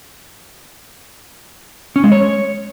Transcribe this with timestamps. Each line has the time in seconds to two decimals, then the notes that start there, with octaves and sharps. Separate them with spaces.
1.96 C#4
2.04 G#3
2.12 C#5